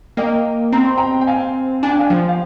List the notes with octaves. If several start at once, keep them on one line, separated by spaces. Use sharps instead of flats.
A#3 D#5 G5
C4 A#5
C6
G5 A#5
G5
F5 G#5
D4 G#5
G5
F5 G#5
F3
F5